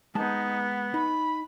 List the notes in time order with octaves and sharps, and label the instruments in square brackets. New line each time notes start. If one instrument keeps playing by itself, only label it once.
[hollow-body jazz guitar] G#3 A5 [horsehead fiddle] B3 [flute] D#4
[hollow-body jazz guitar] D#4 [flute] B5